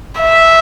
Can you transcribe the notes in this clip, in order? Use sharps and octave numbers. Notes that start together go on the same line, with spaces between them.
E5